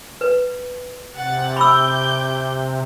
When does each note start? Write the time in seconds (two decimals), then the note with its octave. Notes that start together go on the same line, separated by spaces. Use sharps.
0.21 B4
1.14 C3 F#5 A6
1.56 B5 D6 E6 G6